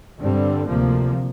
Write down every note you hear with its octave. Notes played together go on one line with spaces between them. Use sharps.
G2 D3 G3 C4
D2 C3 F3 A#3